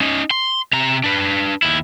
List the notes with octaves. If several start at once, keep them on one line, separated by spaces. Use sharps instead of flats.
C#4 D#4
C6
C3 A#5
D4 B4
D#2 E4